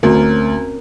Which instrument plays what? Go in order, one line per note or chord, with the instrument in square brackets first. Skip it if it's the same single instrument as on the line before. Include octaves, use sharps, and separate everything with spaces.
[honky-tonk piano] D2 [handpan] C4 C#4 A#4